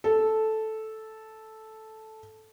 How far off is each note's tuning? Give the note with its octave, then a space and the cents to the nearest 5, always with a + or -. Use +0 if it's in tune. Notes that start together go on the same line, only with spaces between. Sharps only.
A4 -5